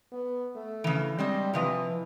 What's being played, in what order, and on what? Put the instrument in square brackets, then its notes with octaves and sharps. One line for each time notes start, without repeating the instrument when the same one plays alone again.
[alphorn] B3
A3
[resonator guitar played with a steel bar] C#3 E3
[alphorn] G3 [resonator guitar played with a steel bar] G#3 C4 D#5
[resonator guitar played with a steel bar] C3 F3 D#5 [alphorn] E3